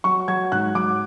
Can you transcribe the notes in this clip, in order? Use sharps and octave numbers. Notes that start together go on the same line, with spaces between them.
F#3 C#6
F#3 G#6
G#2 F#6
F#3 D6